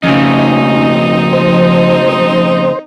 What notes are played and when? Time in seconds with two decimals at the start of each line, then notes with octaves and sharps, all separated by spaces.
0.04 F2 C#3 C4 C#4 D#4
1.33 F3 C5
2.13 C5